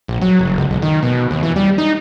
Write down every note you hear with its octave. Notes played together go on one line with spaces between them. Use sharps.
A#1
F#3
F#1
C#2
B1
D#3
B2
D#2
E3
G3
D#4